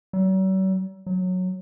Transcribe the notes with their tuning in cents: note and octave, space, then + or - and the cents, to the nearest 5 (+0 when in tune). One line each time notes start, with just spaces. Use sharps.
F#3 +45
F#3 -10